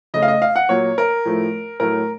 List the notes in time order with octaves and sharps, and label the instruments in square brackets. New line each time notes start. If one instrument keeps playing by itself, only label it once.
[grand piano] C#3 A3 D#5
F5
D#5
F5
F#5
A#2 F#3 A#3 C#5
A#4
A2 F3 A3
A2 F#3 A3 A#4